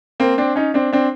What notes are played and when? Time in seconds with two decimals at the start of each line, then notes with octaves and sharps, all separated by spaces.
0.20 A#3 C4
0.38 C4 D4
0.56 C#4 D#4
0.74 C4 D4
0.93 C4 D4